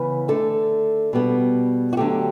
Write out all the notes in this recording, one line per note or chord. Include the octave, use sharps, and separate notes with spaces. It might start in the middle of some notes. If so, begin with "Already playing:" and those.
Already playing: C#3 E3 B3 B4
D3 A3 A4
B2 G3 B3
F#4
D3 F#3 A3 G4